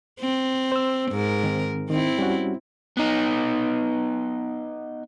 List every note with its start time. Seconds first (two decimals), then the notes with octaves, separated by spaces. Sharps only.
0.20 C4
0.72 C5 E6
1.12 G#2 A#4
1.44 D#3 C4
1.90 D#3 C4 E4
2.19 G3 C#4 F#4
2.97 B3 D#4